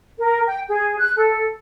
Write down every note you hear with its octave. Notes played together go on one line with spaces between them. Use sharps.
A#4
G5
G#4
F#6
A4